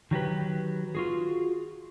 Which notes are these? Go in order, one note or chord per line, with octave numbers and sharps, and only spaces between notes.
D#3 F#3 G4 B4
F4 F#4 G#4